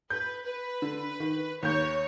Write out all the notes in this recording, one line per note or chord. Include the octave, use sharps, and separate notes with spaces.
B4 G6
B4
D3
D#3
D#2 C#5 G6